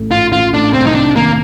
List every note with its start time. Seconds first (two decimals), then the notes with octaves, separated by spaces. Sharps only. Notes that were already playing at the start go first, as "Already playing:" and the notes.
Already playing: A1 A2 A3
0.11 A1 F4
0.32 A1 F4
0.53 A2 D4
0.73 C2 C4
0.86 D#4
0.95 C3 D4
1.15 D#3 A#3